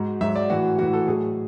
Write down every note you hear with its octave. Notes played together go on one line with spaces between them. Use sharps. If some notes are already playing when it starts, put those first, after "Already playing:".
Already playing: G#2 F#4
G#2 F#3 E5
D5
A2 E3 F#4
A2 E3 F#4
A4
A2 F#3 G#4